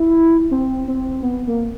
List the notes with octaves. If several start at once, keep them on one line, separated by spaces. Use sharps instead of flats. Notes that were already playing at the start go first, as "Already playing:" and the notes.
Already playing: E4
C4
C4
B3
A#3